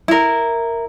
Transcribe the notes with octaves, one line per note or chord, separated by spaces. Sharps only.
E4 A#4